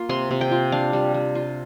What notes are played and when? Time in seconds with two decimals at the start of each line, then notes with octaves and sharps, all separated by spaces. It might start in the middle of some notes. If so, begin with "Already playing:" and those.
Already playing: A#3 F4
0.09 C3 C6
0.31 C3
0.41 G5
0.51 F4
0.72 D4 F5
0.93 G3
1.14 G3
1.35 F4